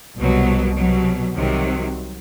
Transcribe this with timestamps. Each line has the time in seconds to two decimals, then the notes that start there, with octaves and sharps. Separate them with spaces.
0.19 C2 B2 F#3
0.77 C2 B2 F#3
1.34 C2 C3 D#3 F#3